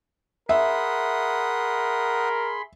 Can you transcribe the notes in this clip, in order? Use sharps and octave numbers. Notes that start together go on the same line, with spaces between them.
G#4 A#4 E5 F#5 B5 C6 D#6